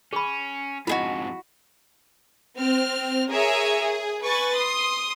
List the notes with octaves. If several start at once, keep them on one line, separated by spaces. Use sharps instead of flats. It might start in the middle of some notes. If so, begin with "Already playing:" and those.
C#4 G#4 B5
F2 G#2 E4 F#4 G#4 D#5 B5
C4 F6
G#4 A#4 C#5 E5 G#5
G#4
B4 G#5 C#6 A6
C6 D#6